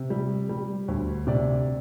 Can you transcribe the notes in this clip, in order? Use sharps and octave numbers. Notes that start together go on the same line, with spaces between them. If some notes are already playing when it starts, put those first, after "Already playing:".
Already playing: C3
G3
G3
D2
C3 D5